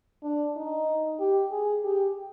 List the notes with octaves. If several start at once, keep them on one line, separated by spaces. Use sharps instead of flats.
D4
D#4
G4
G#4
G4